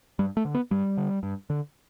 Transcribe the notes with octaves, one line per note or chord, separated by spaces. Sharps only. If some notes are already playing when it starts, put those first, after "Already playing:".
G2 G3
A3
D3
B3
G2 G3
D3
G2
D3